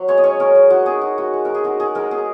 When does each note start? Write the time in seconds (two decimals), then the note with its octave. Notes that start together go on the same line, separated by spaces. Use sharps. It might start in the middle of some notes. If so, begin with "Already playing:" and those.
Already playing: F#3
0.08 G#3 C#5
0.18 D#5
0.24 C#4 C#5
0.40 C#4 A#4
0.55 G#3
0.70 G#3 F#4
0.86 D#4 G#4
1.01 D#4 F#4
1.18 G#3 F#4
1.33 G#3
1.45 D#4 A#4
1.55 G#4
1.64 D#4 F#4
1.80 G#3 G#4
1.95 G#3 A#4
2.11 D#4 G#4